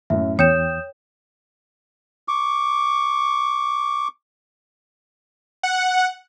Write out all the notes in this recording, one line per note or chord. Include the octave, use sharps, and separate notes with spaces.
F#2 A2 E5
E2 C#5 G5 D#6 G6 E7
C#6 D6
F#5